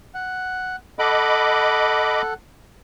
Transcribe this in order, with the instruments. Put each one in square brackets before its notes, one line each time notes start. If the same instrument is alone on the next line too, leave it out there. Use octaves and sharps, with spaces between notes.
[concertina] F#5
[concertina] A4 F#5 [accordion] D#5 B5 D6